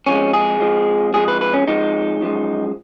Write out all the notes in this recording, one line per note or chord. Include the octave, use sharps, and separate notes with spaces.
F2 F3 G#3 C#4
G#4
F2 F3 G#3
F2 F3 G#3 G#4
B4
B4
C#4
F2 F3 G#3 D#4
F#2 F3 G#3